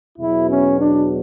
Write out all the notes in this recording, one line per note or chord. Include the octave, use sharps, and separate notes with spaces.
E2 B2 F#3 B3 E4
C#4
D4